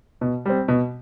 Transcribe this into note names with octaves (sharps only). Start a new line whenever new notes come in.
B2
G3 C4
B2